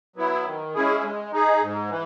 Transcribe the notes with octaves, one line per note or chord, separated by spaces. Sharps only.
F#3 B3 E4
D#3
G#3 C#4 E4 G#4
G#3
D#4 G#4
G#2
E3